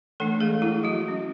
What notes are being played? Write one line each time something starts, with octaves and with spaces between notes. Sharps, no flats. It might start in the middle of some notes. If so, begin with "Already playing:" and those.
E3 A3 D4 A4
G#3 G#4
E4
F#3 F#4
F#3 C#4